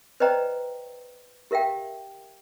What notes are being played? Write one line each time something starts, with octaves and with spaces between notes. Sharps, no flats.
B4 C5 D5 D#5 G5 A#5
G4 A#4 E5 F5 G5